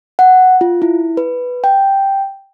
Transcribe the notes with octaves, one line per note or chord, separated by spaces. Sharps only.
F#5
F4
E4
B4
G5